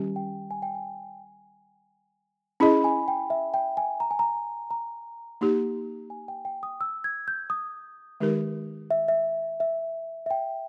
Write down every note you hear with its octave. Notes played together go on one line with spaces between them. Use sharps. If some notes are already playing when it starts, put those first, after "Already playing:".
Already playing: D#3 G3 C#4 G4 G#5
G5
G#5
G5
G#5
C#4 E4 G#4 D#5 B5
G#5
G5
E5
G5
G#5
A#5
G#5
A#5
A#5
A#3 D#4 G4
G#5
G5
G5
D#6
E6
G#6
G6
D#6
D#3 G#3 D#4 G4 A#4
E5
E5
E5
E5
G5